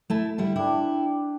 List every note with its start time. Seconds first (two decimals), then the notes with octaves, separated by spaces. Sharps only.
0.10 A3 E4 A5
0.38 D3 G3 E4
0.56 D4 E4 G4